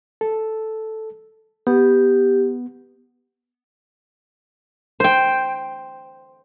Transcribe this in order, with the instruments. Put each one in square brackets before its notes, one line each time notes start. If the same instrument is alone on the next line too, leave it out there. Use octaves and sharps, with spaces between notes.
[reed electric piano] A4
[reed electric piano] B3 [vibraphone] G4
[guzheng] C5 G5